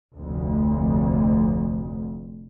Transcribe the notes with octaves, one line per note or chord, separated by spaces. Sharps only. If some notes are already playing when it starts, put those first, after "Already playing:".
F1 D2